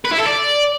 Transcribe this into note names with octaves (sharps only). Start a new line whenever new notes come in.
B4
E4
A4
D5